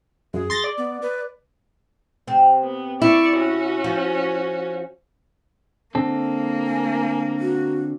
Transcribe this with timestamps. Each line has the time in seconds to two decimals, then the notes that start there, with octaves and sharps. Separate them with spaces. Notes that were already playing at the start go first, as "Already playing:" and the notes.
0.34 F#2 G#4
0.50 C6 A6 A#6
0.64 D5
0.78 B3
1.02 B4
2.28 C3 C4
2.63 B3
3.02 E4 D5 C#6
3.37 C#4 F#4
3.84 F3
5.95 D3 A#3 C4 A4
6.66 G#5
7.40 F#4